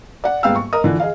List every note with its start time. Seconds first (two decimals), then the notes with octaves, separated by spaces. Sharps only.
0.24 D5 F#5
0.43 D#1 G#2 B3 F5 G5 E6
0.55 C#6
0.73 A#4 D#5 D#6
0.84 D3 E3 F3
1.00 G#4 D#5 F5